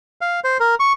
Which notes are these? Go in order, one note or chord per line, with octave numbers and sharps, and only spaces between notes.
F5
C5
A#4
C#6